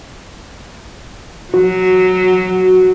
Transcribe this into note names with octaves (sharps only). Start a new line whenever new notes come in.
F#3 F#4